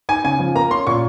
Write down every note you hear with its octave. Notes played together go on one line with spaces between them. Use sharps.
D#4 G#5
C#3 G#5
F3
A#3 A#5
C#4 C6
A#2 C#6